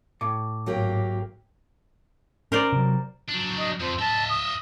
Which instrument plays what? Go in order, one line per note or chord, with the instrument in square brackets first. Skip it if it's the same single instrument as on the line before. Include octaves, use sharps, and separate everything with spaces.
[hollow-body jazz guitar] A2 [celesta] D6
[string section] G#1 [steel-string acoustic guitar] F#3 A#3 G4
[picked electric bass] C#4 [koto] A#4 C5 D5
[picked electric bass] C3 F#3
[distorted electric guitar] F#3 D4
[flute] D#5
[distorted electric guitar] F2 [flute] C5
[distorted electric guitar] D#5 E5 [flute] A5
[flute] D#6